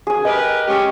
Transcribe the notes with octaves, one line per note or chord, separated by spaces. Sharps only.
G#4 G#5
G4 A#4 B4 D#5 G5
G#3 C#4 G4